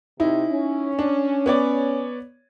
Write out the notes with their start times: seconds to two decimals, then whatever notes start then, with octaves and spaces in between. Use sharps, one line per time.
0.20 C3 D#4 E4
0.49 C#4
0.99 D4
1.46 B3 C#5 D5